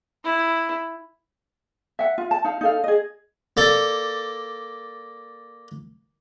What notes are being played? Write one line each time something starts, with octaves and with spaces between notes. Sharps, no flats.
E4
E5 F#5
F4
A5
D#4 F5
D#4 A4 F5
G#4 D#5
A#3 A4 D5